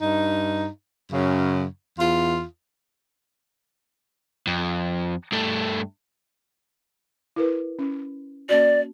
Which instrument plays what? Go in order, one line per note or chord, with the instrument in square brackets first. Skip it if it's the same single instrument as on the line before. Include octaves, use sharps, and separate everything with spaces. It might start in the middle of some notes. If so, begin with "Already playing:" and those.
[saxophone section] G2 D#4
F#2 C#3
E2 F4
[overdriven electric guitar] F2
G2 A3
[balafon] E4 A#4 B4
C#4
[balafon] A#3 C#4 F#4 [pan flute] D5